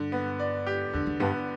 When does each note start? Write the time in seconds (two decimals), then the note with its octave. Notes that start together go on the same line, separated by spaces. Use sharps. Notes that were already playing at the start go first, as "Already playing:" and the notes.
Already playing: G2 D3
0.12 B3
0.39 D5
0.67 G4
0.93 E2 D3
1.07 E2
1.20 G2 B3